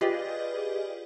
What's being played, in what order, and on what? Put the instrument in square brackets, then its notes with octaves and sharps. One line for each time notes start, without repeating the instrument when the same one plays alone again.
[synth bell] F4 G4 G#4 B4 D5 D#5